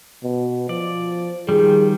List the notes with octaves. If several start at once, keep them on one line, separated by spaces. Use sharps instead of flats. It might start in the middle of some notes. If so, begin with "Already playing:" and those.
B2
F3 D5
D#3 F3 G3 G#4